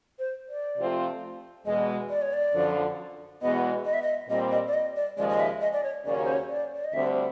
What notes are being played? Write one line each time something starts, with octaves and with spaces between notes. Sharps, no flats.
C5
D5
C3 F3 A3 C4 F4
E2 B2 G#3 D#5
D5
C#5
D5
F#2 D3 F3
E2 B2 G#3 B3 D#5
D#5
E5
D#5
A#2 G3 C4 D#5
D#5
D5
D#5
D5
D#2 C#3 F3 G#3 D5
D#5
E5
D#5
D5
C#5
D#2 C#3 F#3 A#3 C#4 D5
C#5
C5
C#5
D5
D5
D#5
D2 D3 G3 C4 E5